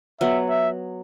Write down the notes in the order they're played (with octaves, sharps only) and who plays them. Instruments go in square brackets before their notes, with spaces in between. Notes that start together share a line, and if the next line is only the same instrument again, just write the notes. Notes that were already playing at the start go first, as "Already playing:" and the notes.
[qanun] F#3 B3 [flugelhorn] E5
[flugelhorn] E5